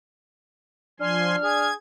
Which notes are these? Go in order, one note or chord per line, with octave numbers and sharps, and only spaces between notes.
F3 D4 G#5 C6 F6
G#4 G#6